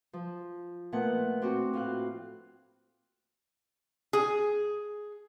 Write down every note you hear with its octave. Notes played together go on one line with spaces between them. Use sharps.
F3
A#2 A3 B3 F#5
C4 D4 F#4
A2 F4 F5 F#6
G#4